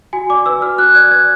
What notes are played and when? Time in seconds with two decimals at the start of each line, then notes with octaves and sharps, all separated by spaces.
0.13 F#4 G#5
0.30 D5 D6
0.46 B4 E6
0.62 F#4 F6
0.78 F#4 F#6
0.95 D5 G#6
1.11 B4 G#6